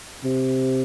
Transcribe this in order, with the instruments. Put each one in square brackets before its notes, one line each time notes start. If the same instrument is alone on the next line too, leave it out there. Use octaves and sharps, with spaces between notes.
[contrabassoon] C3